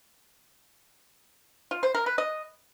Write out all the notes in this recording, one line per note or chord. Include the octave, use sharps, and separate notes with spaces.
F4
C5
A#4
B4
D#5